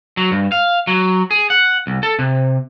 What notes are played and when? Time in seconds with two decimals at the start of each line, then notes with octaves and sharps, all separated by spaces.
0.17 F#3
0.31 G2
0.52 F5
0.87 F#3
1.31 G#4
1.50 F#5
1.87 C2
2.03 A4
2.19 C3